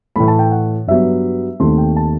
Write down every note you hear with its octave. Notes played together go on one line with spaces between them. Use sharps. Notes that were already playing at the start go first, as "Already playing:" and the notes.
A2 E3 A3 B5
A5
G5
F#5
G2 F#3 B3 E5
D#2 D#3 A3 C4 C6
G5
A5